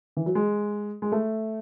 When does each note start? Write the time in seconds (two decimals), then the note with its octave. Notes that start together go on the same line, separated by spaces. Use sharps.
0.17 E3
0.26 F#3
0.35 G#3
1.02 G#3
1.12 A3